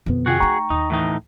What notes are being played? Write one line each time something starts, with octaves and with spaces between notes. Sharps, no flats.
F2 B2 D#3 B3
C3 F4 F#4 G#4 G5
A3 D#4 G5 A#5 C#6
D#2 D#4
A2 E3 D#4